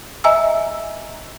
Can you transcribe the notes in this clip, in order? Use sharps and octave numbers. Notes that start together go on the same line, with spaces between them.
D#5 E5 G#5 A#5 E6